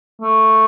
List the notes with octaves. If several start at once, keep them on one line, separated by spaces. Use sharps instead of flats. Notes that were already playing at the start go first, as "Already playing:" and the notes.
A3